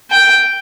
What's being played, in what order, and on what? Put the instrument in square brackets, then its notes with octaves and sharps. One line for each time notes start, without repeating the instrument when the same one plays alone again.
[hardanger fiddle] G5